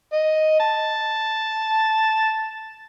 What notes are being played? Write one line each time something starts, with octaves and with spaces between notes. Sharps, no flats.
D#5
A5